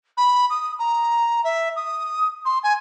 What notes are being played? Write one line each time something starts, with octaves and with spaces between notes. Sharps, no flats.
B5
D#6
A#5
E5
D#6
C6
G#5